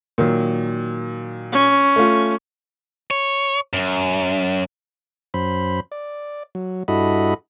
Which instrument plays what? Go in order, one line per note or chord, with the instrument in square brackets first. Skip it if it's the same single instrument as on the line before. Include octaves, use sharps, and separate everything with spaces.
[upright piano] A#2 D#3 F#3
[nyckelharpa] C#4
[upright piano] A3 F4
[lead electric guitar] C#5
F#2
[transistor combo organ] F#2 C5 B5
D5
F#3
G2 E4 F#4 A4 D#5 B5